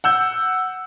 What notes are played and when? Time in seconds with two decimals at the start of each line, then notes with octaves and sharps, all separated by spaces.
0.04 F#5 E6 G6